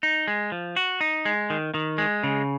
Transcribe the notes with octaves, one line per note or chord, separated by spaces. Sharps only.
D#4
G#3
F3
F#4
D#4
G#3
D#3
D#3
G#3
C#3